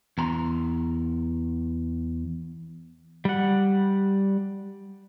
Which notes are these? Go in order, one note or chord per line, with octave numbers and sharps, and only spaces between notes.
E2 A#5 C6
G3 F#5